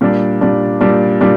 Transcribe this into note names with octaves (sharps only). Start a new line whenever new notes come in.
A#2 G3 D4
A#2 G3 D4
A#2 G3 D4
A#2 G3 D4